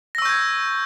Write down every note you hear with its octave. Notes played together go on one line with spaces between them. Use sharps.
C#6 E6 G6 G#6 A#6